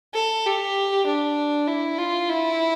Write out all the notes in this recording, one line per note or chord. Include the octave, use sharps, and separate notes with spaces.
A4
G4
D4
E4
F4
E4